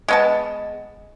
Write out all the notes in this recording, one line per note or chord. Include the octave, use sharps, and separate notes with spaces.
G#3 B3 A5